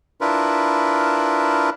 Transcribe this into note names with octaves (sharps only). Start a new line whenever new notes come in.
D4 E4 F4 A#4 B4